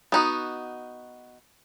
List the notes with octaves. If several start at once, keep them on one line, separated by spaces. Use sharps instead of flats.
B3 D#4 F#4